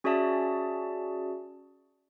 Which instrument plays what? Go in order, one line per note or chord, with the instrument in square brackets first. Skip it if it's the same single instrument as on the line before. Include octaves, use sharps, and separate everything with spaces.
[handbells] C#4 F#4 G#4 D5 E5 A5